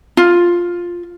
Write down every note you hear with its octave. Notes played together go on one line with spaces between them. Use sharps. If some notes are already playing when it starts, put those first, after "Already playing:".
F4